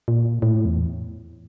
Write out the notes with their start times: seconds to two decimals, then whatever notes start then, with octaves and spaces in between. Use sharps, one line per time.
0.08 A#2
0.42 A2
0.65 E2